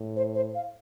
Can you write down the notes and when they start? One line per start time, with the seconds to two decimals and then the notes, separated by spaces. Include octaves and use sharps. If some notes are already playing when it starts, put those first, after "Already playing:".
Already playing: A2
0.16 C5
0.35 C5
0.55 F5